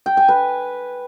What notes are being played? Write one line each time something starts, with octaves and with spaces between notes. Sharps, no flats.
G5
G#5
B4